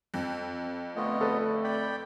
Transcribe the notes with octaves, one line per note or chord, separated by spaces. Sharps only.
F2
D3 A3 B3 F4 D#5
A4 B4
D5 G5 B5